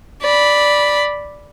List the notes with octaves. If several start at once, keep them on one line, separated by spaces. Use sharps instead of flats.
D5 B5